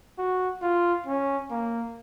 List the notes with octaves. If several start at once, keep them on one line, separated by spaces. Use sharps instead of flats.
F#4
F4
C#4
A#3